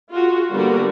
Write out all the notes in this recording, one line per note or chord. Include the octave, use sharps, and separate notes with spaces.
F4 F#4 G#4
D3 G3 A#3 B3 F#4 A#4